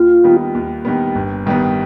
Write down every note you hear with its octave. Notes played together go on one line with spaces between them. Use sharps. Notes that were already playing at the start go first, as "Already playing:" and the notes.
Already playing: D#2 F4
D#3 G3 B3
D#2
D#3 G3 B3
G1
G2 D#3 G3 B3